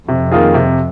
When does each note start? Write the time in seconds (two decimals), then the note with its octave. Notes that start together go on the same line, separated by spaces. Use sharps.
0.08 F2 C3
0.32 D#3 A#3 F4 G#4
0.54 C3